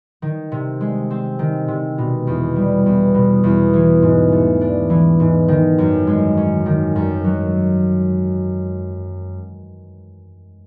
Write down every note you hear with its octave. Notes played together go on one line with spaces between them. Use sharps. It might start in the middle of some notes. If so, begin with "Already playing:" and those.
D#3
C3
G#3
C4
D#3
C3
B2
E2
G3
E2
B2
E2
E3
G#2
A3
D4
E3
G#2
D#3
F#2
G#3
C#4
D#3
F#2
F#3